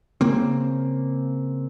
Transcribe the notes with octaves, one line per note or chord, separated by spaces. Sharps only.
C#3 A#3 C4